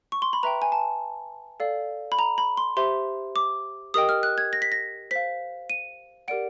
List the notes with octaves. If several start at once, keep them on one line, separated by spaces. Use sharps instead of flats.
C#6
C6
B5
B4 E5 G5 A#5
G#5
A5
A4 D5 F5
B5
A#5
B5
C6
G4 C5 E5 C6
D6
G4 A#4 D#5 G5 D#6
F6
F#6
G#6
A#6
B6
A#6
C5 F5 B6
D#7
G4 A#4 D5 F#5 D7